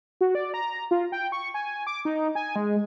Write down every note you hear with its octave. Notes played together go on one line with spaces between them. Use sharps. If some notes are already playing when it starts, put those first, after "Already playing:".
F#4
D5
A#5
F4
G5
C#6
G#5
D6
D#4
G#5
G#3